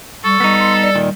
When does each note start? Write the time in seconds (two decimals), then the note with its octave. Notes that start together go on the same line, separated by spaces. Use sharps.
0.24 G3 A4 C#6
0.40 G3 B3 D#4
0.60 C6
0.83 D5
0.95 A#2 D#3